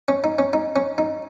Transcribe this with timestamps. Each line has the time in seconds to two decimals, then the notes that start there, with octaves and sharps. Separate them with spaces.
0.08 C#4
0.24 D#4
0.38 C#4
0.53 D#4
0.76 C#4
0.98 D#4